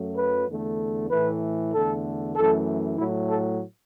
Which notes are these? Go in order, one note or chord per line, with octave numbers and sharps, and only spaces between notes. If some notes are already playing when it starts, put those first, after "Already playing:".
Already playing: F#2 F#3 A3
B4
E2 D3 A3
A2 E3 A3 B4
E2 D3 A3 A4
F#2 E3 A3 A4
A2 F#3 A3 E4
A4